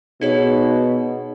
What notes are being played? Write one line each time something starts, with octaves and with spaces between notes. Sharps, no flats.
B2 D#4 G#4 C#5